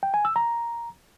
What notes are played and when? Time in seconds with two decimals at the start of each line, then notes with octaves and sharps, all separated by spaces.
0.03 G5
0.14 G#5
0.25 E6
0.36 A#5